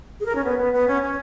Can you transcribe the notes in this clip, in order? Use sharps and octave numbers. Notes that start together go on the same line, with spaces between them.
G#4
A#4
C#4
B3
B3
B3
C#4
C#4